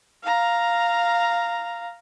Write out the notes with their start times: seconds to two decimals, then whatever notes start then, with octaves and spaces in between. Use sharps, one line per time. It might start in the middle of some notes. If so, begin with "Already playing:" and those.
0.23 F5 A#5